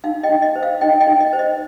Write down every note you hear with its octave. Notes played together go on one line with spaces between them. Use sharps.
D#4 F5
D#5 G5
D#4
D#5
C5
F5
D#4 D#5 G5
D#5 G5
D#4
D#5
C5
D#5